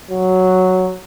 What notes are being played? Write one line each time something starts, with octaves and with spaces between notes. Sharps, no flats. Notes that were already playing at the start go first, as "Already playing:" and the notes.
F#3